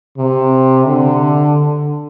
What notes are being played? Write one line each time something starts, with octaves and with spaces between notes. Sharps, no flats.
C3
D3